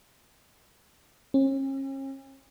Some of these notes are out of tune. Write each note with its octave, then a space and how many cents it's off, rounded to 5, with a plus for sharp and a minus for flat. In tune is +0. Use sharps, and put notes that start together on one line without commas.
C#4 -40